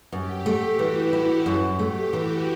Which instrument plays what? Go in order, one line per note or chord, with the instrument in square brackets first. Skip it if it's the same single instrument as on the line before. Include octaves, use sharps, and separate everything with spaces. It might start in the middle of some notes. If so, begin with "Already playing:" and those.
[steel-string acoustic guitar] F#2 [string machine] G4
[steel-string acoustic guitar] A3 [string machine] G4
[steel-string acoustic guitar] E3 [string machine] F#4
[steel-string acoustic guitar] E4 [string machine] F#4
[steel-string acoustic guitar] F#2 [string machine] A4
[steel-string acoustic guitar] A3 [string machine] G4
[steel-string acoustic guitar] E3 [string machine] F#4